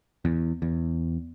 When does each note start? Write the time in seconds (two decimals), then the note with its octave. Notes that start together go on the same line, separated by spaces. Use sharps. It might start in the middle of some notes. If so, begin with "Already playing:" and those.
0.25 E2
0.62 E2